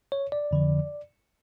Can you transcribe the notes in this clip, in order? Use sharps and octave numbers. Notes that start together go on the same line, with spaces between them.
C#5
D5
F2 D3 F3